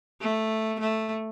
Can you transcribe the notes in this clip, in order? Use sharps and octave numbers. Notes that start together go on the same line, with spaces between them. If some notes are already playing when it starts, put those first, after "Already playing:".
A3
A3